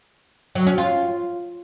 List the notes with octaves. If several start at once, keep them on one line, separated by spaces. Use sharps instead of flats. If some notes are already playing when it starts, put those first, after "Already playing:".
F#3
C#4
F4